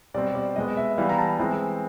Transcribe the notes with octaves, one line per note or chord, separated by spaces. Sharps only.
B2 G3 C4 D5
D5
B2 G#3 B3 D#5
E5
E3 G3 B3 F5
A#5
A5
E3 G#3 C4